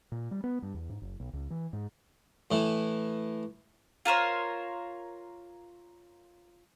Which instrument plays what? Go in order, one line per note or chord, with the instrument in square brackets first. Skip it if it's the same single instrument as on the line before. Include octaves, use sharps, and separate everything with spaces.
[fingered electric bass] A#2
G3
B3
G2
E2
G#2
F#1
B1
C#2
E3
G#2
[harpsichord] A2 E3
[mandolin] F4 A#4 C5 C#5